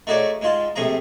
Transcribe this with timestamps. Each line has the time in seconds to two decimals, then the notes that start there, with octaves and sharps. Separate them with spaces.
0.07 A3 D#4 F#4 G#4 C#5 D5
0.41 G#2 G#3 F4 A5
0.76 A#1 C3 A3 G#4 A#5